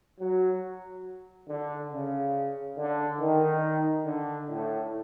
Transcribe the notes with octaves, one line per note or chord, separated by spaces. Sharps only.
F#3
D3
C#3
D3
D#3
D3
A2